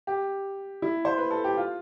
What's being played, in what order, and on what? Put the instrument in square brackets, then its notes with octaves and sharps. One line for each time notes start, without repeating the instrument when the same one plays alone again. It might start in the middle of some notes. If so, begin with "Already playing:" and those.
[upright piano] G4
E4
C5
B4
A4
G4
F4